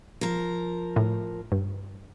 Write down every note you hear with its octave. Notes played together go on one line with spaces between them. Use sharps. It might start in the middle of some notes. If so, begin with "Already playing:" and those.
F3 A#4
A2
G2